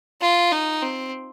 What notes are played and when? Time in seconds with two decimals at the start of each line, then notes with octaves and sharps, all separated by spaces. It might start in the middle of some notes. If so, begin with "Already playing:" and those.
0.21 F4
0.51 D#4
0.82 C4